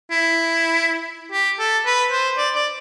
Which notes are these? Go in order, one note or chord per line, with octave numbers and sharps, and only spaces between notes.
E4
G4
A4
B4
C5
D5
D5